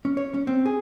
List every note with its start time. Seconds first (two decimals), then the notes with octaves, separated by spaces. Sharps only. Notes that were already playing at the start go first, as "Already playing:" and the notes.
0.05 C#4
0.17 C#5
0.34 C#4
0.47 C4
0.66 G#4